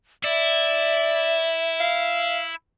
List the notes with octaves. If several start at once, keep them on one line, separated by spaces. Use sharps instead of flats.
E4 D5 E5
F5